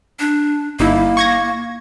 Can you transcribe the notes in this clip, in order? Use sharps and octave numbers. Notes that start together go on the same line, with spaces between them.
D4
G1 A#3 D#4 E4
C#6 G#6 A#6